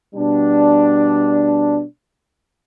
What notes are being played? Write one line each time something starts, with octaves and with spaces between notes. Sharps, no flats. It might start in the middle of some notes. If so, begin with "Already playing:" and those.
B2 G3 D4